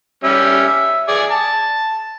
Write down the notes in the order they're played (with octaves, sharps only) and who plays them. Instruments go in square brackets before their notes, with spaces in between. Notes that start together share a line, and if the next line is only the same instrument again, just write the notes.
[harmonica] G3 C#4 E5
E5
G#4 D5 G#5
A5